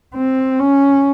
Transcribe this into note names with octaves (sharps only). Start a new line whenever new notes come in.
C4
C#4